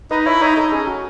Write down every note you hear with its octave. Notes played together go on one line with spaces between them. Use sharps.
D#4 B4 D#5
E4 C#5 E5
D#4 C#5 E5
D#4 A4
C#4 G#4
F#4